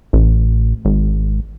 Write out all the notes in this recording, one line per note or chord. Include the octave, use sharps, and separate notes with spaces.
A1
G#1